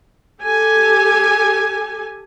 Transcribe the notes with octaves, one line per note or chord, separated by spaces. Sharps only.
G4 A4 G#5